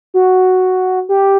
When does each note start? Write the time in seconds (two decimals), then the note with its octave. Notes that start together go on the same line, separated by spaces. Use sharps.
0.14 F#4
1.09 G4